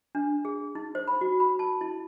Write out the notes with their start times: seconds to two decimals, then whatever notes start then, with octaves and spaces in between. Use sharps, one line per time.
0.15 D4
0.45 G#4
0.75 D#4
0.95 C5
1.08 B5
1.21 F#4
1.40 B5
1.59 A5
1.81 E4